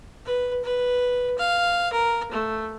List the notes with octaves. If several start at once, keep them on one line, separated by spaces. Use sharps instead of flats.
B4
B4
F5
A#4
A3